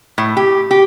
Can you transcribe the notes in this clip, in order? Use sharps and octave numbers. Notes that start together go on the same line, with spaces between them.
A2
G4
G4